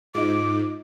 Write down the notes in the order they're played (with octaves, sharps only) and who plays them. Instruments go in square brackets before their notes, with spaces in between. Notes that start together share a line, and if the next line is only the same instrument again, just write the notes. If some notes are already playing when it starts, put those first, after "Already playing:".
[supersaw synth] G#2 [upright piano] D#4 F4 [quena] D6